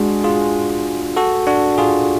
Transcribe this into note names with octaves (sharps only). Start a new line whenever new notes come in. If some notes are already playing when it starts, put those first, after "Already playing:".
Already playing: G#3 D4 F#4
F4 G#4
F#4 A4
D4 F#4
F4 G#4